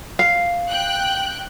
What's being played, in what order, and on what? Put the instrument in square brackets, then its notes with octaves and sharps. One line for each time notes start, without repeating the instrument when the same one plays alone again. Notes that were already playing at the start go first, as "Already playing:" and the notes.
[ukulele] F5
[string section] G5 F#6